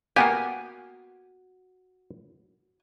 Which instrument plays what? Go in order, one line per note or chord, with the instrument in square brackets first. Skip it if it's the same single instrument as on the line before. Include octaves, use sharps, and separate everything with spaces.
[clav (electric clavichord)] A#3 B3 G4 [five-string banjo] F#4 G#5